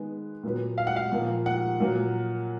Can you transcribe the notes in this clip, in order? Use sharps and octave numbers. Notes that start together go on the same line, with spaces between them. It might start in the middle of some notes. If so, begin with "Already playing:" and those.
Already playing: D#3 G#3 B3
A#2 F#3 B3
F5
F#5
F5
A#2 F3 A#3
F#5
A#2 F#3 A#3